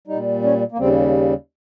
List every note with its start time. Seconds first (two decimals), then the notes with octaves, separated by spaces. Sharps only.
0.07 A#2 G3 D#4
0.43 C#4
0.72 A#3
0.78 D#2 C#3 G3 C4